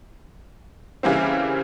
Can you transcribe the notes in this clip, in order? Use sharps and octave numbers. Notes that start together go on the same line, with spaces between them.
C#3 E3 G3 A#3 C4